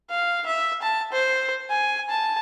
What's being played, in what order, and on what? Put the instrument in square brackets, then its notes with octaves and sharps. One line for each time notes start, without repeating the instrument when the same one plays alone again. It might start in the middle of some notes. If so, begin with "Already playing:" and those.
[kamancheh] F5
E5
A5
C5
G#5
A5